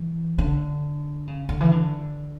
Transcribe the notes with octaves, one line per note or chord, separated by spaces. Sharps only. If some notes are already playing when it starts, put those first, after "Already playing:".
Already playing: E3
D3
C#3
D3
E3
D3